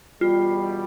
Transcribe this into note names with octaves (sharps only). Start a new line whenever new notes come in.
E2 B2 G3 F4